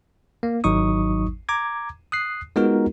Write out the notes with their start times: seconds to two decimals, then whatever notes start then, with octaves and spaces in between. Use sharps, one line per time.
0.43 A#3
0.64 G#1 F#3 D#4 C#6 D#6
1.49 A#5 D6 G#6
2.12 D#6 F#6 C7
2.56 G#3 B3 D#4 F4 F#4 A#4